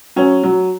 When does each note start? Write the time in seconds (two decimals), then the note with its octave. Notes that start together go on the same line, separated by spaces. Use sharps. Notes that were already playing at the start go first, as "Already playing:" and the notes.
0.16 F#3 C#4
0.44 F#3